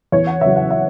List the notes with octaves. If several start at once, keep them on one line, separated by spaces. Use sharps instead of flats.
E2 C#5
F#5
C#3 F#3 E5
F#5
E5